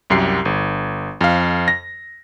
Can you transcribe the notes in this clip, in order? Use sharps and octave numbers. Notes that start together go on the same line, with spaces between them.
C2 F#2 G4 C7
G1
F2 F5
A#6